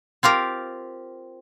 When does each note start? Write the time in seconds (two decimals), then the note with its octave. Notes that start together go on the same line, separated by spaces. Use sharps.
0.23 C4 F4 G4 A#4